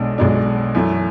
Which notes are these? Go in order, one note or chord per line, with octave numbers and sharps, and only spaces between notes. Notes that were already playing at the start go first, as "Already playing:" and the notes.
Already playing: B1 B2 G#3 D4
B1 B2 G#3 D4
F#2 E3 A3